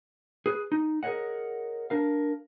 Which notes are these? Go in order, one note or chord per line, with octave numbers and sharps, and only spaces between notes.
G#4 B4
D#4
G#4 A#4 C5 C#5 D#5 F#5
D4 A#4 F5